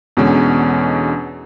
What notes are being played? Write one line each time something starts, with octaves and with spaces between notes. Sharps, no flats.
E2 B2 D3 G#3 C#4